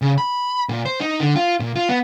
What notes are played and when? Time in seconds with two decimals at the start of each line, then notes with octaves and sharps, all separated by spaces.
0.02 C#3
0.18 B5
0.69 A#2
0.85 C5
1.00 D#4
1.20 D3
1.36 F4
1.60 A#2
1.76 F4
1.89 B3